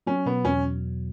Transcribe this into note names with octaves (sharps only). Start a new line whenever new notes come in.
F#3 C#4
B2 B3
E2 C#4